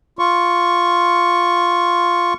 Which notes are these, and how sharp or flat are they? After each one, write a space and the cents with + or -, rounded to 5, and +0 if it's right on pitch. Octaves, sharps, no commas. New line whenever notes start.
F4 +0 C#6 +0